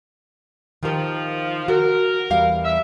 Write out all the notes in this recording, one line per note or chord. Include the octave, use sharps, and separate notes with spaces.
D#3 F3 G4 A#4
F#4 A#4
E2 G3 F5
E5